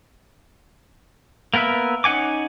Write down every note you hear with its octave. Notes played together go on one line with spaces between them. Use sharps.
A#3 B3 A#4 B4 E5
C#4 D#4 F#5 G#5 D6